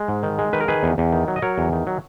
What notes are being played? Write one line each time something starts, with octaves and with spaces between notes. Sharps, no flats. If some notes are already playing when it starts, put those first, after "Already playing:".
Already playing: G#3
G#2
D#3
G#3
D#3 B4
A#4
D#3 G#4 B4
E2
E2
D#3
F#3
D#5
F#3 A#4 C#5
E2
D#3
F#3